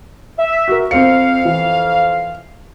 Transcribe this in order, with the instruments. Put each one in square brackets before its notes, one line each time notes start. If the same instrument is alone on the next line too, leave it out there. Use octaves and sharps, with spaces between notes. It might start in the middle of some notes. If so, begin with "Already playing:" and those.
[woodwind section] E5
[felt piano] F#4 A#4
[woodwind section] F2 F5 [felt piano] C4 C#7
[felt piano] E3